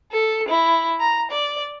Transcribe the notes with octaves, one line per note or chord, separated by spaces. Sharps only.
A4
E4
A#5
D5